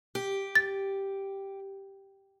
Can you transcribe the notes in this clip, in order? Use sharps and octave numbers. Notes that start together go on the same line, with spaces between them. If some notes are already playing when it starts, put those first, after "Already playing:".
G4
A6